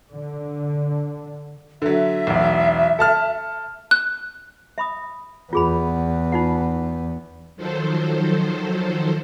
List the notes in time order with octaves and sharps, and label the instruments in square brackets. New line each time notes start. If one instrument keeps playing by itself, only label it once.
[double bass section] D3
[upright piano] D3 F#3 [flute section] E5
[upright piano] E1 B1
A4 A5 F6
[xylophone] F#6
[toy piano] E5 B5 D#6
[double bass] E2 B3 [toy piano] F4 G#4 B5
[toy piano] D#4 F4 F#5
[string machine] D#3 F3 F#3 A4 C5